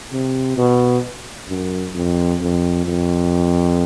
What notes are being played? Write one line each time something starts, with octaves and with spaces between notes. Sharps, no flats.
C3
B2
F#2
F2
F2
F2